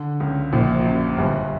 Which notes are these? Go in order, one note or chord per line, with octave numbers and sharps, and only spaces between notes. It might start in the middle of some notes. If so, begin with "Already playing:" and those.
Already playing: D3
C#2 C#3
A#1 A#2
F#2
G1 G2